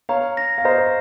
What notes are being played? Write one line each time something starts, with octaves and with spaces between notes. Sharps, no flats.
C#5 F5 A#5
A#6
F5
C5 D#5 A#5